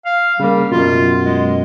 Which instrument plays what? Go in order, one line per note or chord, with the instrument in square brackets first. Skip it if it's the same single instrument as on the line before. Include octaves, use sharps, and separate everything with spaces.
[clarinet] F5
[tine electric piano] C#3 A#3 [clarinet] G3
[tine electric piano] F#2 B2 [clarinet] F4
[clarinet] G#3